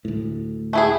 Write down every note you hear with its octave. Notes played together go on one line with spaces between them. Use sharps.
D2 A2
A3 E4 G#4